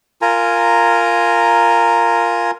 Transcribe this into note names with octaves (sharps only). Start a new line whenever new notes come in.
F4 A#4 G#5 A#5